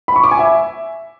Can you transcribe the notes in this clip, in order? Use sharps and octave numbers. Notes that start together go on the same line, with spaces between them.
B5
C#6
D6
G#5
E5